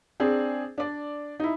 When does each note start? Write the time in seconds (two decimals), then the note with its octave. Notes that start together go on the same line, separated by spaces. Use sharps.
0.20 C4 D4 G#4
0.78 D4 D5
1.40 D#4 E4